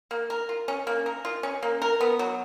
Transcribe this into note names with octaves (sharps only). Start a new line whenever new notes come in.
A#3
A#4
F4
C#4
A#3
A#4
F4
C#4
A#3
A#4
B3
F#3